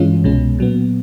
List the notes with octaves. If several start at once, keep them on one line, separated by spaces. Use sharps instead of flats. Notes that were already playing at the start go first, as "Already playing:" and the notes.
Already playing: G2 E3 G#3 C#4 F4
C2 B2 G#3 C#4
A#2 F#3 B3